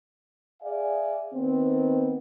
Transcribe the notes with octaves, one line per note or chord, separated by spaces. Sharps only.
G#4 D5 E5 F5 G#5
D#3 B3 C4